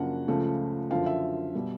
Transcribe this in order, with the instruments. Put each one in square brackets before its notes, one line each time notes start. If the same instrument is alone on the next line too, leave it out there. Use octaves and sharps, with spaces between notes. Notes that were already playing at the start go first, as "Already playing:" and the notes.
Already playing: [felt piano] F#2 C#3 F3 A#3 D4 F#5
C#2 C#3 F3 A3
F#2 D3 F3 F5
E5
B2 G3